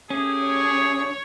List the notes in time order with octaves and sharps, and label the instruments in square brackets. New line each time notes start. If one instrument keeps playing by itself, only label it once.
[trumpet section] A3 G4 G#4 [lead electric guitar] C#4
[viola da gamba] C#5